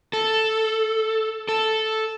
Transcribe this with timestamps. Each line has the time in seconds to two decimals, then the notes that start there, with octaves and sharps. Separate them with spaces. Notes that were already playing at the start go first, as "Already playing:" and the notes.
0.13 A4
1.49 A4